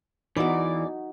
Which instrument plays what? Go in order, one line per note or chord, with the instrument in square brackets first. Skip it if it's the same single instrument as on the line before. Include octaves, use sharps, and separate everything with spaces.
[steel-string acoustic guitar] E2 D5 [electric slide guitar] E3 [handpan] D#4 F#4